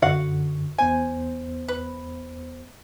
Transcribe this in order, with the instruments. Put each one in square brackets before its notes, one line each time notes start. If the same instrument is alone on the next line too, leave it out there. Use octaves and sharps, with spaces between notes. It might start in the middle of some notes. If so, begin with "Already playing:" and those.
[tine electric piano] F#2 D3 [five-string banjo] F#4 F5 F#5
[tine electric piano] E2 B3 C5 [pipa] G#5
[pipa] B4